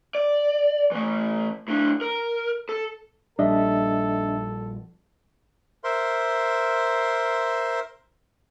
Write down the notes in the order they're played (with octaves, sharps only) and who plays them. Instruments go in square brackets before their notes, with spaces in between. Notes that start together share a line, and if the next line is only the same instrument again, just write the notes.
[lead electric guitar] D5
E3 A3
A2 D4
A#4
A4
[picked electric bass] A#1 G3 [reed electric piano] D4 D#5 E5 [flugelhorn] A4
[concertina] A#4 C5 E5 C6